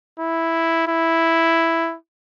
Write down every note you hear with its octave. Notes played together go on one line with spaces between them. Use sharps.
E4
E4